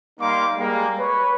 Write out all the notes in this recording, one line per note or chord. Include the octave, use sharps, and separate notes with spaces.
G3 A#3 D#4 F5 C6 D6
G3 G#3 A#3
B4 C#5